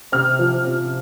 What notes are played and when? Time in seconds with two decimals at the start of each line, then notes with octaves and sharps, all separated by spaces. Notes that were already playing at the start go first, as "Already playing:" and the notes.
0.12 C3 F6
0.39 F3
0.65 C3